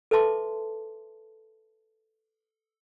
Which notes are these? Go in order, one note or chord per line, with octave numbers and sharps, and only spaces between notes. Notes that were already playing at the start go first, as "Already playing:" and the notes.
A4 B4 E5 A5 C6 D6